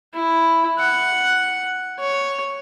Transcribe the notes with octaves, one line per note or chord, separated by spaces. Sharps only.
E4
F#5
C#5